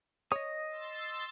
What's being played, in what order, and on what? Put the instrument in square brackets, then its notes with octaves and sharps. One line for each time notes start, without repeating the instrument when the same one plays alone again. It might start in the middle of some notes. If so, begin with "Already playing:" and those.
[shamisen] C#5 [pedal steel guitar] D#5 D#6
[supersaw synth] C6 E6 A6